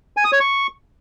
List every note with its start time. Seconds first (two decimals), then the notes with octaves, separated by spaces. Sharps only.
0.17 G#5
0.24 D#6
0.32 C#5
0.40 C#6